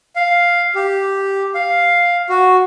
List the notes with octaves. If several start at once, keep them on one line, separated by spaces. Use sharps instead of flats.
F5
G4
F5
F#4